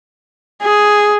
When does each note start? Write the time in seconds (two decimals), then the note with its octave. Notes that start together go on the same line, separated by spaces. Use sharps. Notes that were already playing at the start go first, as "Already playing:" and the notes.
0.62 G#4